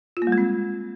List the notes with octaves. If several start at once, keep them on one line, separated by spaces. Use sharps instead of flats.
F4
A#3
G3
G#3
C4